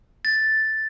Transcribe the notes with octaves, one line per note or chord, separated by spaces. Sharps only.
A6